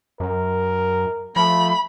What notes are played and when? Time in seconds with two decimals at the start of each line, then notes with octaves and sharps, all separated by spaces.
0.20 F#2 A#4
1.36 F3 A3 B5